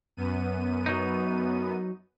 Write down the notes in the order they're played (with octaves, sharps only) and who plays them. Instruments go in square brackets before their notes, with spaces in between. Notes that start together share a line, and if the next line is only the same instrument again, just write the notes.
[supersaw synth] F#2 B3 D#7
[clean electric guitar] F#3 D#4